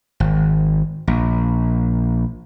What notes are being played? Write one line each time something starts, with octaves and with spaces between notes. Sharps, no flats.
G#1
A#1